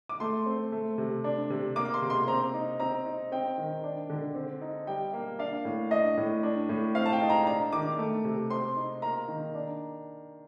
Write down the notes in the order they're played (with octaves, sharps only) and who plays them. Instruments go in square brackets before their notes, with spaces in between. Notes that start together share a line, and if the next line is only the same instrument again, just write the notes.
[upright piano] D6
A3 C6
C4
A3
C3
D4
C3
A#3 D6
C6
C3
C6
C4 A#5
D#4
C4 A#5
D#4
C4 G5
D#3
D4
D3
C4
D#4
G3 G5
A#3
D4 F5
A2
D4 D#5
A2
D4
A2
C4 F5
A5
G5
D#4
A#5
D4 A#5
D#3 D6
A3
C3
C4 C6
D#4
A#3 A#5
D#3
D4